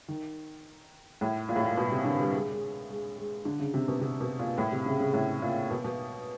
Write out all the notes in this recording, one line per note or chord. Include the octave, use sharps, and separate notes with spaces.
D#3
A2
A#2
A2
A#2
B2
C3
D3
G3
G#3
G#3
G#3
G#3
D3
C#3
C3
B2
C3
B2
A#2
A2
C3
C#3
C#3
A2
A#2
B2
B2